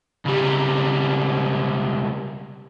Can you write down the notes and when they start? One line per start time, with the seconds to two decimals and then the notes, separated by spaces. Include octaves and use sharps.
0.25 C#2 G3